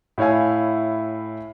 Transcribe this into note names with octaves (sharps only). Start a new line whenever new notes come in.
A2 E4 C#5 F5 G#5